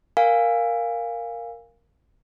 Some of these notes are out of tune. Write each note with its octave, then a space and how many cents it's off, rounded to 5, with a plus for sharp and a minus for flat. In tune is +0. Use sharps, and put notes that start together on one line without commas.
A#4 +0 F5 +0 G#5 -25